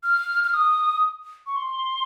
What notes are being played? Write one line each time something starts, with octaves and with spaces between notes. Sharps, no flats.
F6
F6
D#6
C#6
C6